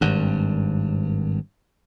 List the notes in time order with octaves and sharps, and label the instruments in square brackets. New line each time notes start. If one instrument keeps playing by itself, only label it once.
[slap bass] G#1 G2